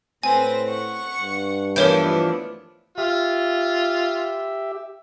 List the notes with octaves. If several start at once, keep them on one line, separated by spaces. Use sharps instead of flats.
A2 C4 B4 G#5 A#6
F#5 C#6
G2
E3 F3 A3 B3 D4 A#4 C#5 G6
F4 G4 E5